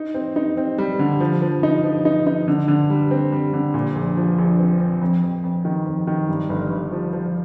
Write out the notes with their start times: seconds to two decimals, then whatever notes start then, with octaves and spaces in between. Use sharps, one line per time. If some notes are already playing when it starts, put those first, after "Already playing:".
Already playing: D#4
0.14 C4
0.36 D#4
0.57 C4
0.78 G3
0.99 D3
1.20 F3
1.42 F3
1.63 D#4
1.84 F3
2.05 D#4
2.27 D#4
2.48 D3
2.68 D3
2.90 G3
3.11 C4
3.32 G3
3.53 D3
3.74 A#2
3.96 A#1
4.17 F3
4.38 A#1
4.59 C4
4.80 C4
5.01 F2
5.22 F2
5.43 F2
5.65 D#3
5.86 F2
6.07 D#3
6.29 G2
6.50 G1
6.70 G1
6.92 F3
7.13 F3